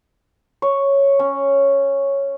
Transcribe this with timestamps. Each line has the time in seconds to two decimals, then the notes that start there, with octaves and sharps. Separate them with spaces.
0.62 C#5
1.19 C#4